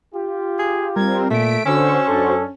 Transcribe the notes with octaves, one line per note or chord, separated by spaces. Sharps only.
F4 G4
G#4
G3 C4 A#4 G#6
A#2 A3 B6 D7
D3 C#4 F#4 C5 C#6 E6
F#2 D4 A4